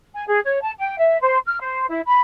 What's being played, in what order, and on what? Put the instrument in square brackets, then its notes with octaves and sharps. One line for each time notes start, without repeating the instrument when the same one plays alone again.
[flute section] G#5
G#4
C#5
A5
G5
E5
C5
F6
C5
E4
B5